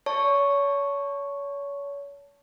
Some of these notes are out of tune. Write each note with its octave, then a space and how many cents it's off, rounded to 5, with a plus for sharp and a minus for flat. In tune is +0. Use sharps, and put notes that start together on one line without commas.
C#5 +30 A5 +5 C#6 +0